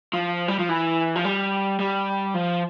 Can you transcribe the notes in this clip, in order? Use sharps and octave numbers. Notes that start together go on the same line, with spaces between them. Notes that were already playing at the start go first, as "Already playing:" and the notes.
F3
G3
F3
E3
F3
G3
G3
F3